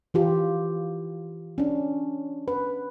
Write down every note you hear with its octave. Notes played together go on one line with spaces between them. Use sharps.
E3 F4 G4
C#4 D4
B4